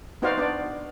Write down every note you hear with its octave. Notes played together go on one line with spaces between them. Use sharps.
B3 D#4 F#4 C5 D5 F5
B3 D4 D5